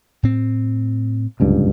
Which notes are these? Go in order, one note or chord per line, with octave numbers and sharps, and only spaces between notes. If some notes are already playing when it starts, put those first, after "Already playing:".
A2 C4
D1 C#2 G2